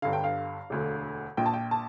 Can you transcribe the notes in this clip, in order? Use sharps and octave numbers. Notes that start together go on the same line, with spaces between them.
G1 G2 D3 F5
G5
F5
E1 D2 D3
A#1 A#2 G5
A5
G5
A5